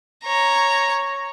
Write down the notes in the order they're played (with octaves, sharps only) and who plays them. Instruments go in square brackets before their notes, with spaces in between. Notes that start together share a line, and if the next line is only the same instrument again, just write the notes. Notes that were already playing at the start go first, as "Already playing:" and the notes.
[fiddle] C#5 A#5